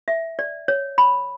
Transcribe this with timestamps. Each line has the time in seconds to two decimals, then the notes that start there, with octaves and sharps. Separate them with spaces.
0.08 E5
0.39 D5
0.68 C#5
0.98 B5